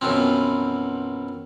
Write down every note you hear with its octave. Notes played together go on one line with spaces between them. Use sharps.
F#2 B2 E3 F3 C4